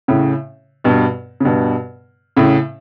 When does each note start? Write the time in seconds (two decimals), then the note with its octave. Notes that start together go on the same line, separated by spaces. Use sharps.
0.08 A2 C#3
0.84 G2 B2
1.40 C#3
1.45 G2 B2
2.37 A2 C#3